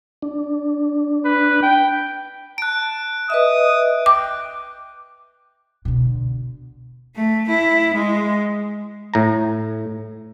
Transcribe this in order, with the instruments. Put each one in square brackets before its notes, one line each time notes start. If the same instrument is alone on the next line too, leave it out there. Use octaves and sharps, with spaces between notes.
[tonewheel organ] D4
[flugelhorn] B4
G5
[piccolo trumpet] A5 [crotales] F#6 D7
[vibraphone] B4 D#5 E5 [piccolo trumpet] D#6
[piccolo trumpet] G5 [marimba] D6
[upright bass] B2 D3
[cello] A3
E4
G#3
[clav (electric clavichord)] A2 A#5